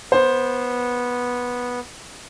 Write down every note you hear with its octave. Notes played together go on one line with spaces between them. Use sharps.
B3 C5